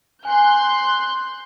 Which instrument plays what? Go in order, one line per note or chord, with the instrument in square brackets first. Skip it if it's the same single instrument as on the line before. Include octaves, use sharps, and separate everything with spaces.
[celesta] G#5 [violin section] C6 F#6 G6